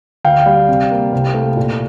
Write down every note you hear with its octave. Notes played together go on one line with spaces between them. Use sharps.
D2 F5 G5
G3
C3
A#3
C2
A3
A#2